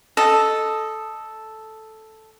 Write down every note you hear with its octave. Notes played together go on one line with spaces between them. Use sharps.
A4 D#5